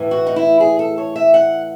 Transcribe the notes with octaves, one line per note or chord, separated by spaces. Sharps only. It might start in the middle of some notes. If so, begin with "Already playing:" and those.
Already playing: A2 E3
F#4
D#4
E4
G#4
A4
C#5
E5
F#5